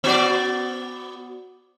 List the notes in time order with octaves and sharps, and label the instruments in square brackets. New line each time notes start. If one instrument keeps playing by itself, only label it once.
[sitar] B3 F#4 D5